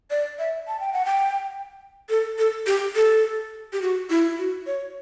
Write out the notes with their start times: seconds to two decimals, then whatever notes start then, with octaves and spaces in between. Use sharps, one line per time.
0.10 D5
0.39 E5
0.68 A5
0.80 G5
0.93 F#5
1.05 G5
2.09 A4
2.38 A4
2.67 G4
2.96 A4
3.73 G4
3.82 F#4
4.10 E4
4.38 F#4
4.67 C#5